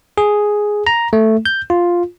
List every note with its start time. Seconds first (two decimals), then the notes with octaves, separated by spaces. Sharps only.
0.18 G#4
0.87 A#5
1.13 A3
1.45 G6
1.70 F4